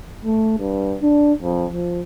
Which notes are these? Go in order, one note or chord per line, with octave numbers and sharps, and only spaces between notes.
A3
G2
D4
F2
F3